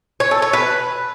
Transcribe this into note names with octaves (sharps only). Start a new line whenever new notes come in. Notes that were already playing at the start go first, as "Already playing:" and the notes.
C#5
A4
C#5
B4